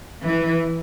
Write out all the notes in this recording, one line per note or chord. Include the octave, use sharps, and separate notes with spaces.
E3